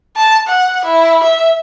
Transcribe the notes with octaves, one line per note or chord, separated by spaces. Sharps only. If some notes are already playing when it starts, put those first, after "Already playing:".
A5
F#5
E4
E5